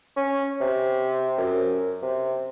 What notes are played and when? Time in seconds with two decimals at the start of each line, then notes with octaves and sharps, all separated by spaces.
0.16 C#4
0.61 C3
1.38 F#2
2.02 C3